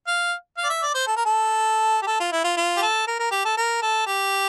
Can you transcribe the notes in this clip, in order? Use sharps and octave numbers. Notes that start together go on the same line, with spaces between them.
F5
F5
D5
E5
D5
C5
A4
A#4
A4
G4
A4
F4
E4
F4
F4
G4
A4
A#4
A#4
G4
A4
A#4
A4
G4